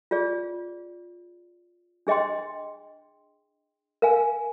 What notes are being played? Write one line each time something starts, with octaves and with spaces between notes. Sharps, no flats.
F4 G#4 D5
D4 G#4 D#5 G5 C6
A#4 F5 G#5